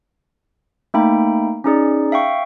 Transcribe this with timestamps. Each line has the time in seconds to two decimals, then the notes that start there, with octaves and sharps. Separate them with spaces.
0.94 A3 A#3 D#4 G5 B5
1.64 C#4 D#4 G#4 D5
2.12 E5 F5 G5 C#6